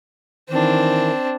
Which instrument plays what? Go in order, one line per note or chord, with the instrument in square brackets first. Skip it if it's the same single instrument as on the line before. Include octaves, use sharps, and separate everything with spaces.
[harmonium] D#3 E3 [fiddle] C4 D4